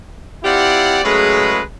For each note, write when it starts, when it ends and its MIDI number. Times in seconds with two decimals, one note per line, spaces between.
0.44 1.00 60
0.44 1.00 64
0.44 1.00 65
0.44 1.00 67
0.44 1.00 74
0.44 1.00 78
1.04 1.60 49
1.04 1.60 54
1.04 1.60 56
1.04 1.60 57
1.04 1.60 71